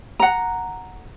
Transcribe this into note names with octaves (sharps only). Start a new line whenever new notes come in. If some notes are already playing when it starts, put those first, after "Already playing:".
F#5 A#5